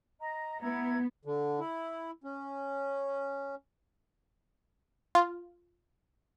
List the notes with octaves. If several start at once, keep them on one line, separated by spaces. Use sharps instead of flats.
D#5 A#5
B3 E4 A#5 G#6
D3
E4
C#4
F4